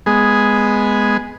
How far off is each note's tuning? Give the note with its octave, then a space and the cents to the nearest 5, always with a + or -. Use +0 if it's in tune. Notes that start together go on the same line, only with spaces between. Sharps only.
G#3 +0 B3 +0 G#4 +0